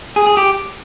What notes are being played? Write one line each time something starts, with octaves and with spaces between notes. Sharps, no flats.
G#4
G#4
G4